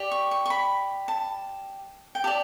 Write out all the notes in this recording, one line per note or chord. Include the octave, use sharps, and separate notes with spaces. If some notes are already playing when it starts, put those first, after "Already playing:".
Already playing: G4 D5
C#6
C#6
C#6
B5
A5
G5
G4 D5 A5